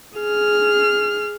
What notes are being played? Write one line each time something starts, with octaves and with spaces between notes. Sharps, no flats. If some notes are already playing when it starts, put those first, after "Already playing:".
G#4 F6